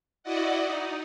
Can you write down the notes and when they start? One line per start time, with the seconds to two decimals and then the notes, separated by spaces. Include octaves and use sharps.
0.23 E4 F#4 D5 D#5 F#5
0.67 D#4